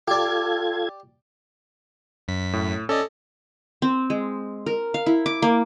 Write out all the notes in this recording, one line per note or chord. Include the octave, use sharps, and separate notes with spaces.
F4 G4 A4 D5 G#6
F#2 B6
A2
C#4 A4 D5 D#5
C4
G#3
A#4
F5
E4
D6
A#3